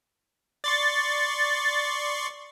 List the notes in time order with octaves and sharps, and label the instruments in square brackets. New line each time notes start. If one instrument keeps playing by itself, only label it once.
[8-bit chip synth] D5 C6 C#6 [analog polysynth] A6